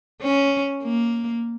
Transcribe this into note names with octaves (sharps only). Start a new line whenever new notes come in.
C#4
A#3